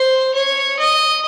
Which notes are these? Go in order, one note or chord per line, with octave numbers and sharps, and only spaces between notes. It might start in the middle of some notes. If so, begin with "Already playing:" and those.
Already playing: C5
C#5
D#5